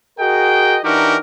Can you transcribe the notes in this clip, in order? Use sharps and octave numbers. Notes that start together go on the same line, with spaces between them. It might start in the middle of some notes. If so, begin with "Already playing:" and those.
F#4 G#4 A#4 D#5 G5
E3 D4 D#4 F#4 G4 A#4